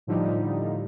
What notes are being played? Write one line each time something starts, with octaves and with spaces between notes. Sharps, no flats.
A2 D3 F3 G3 D#4